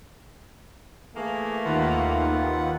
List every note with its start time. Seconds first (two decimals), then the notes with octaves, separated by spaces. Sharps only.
1.16 E3 A3 A#3 G#4
1.65 D#2 F4 B4 F#5